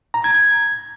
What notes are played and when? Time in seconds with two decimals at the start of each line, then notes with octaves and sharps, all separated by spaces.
0.14 A#5
0.24 G#6
0.34 G#6